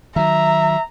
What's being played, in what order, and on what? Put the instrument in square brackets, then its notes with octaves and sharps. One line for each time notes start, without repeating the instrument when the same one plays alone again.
[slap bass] D#3 F#3 [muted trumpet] E5 [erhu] A#5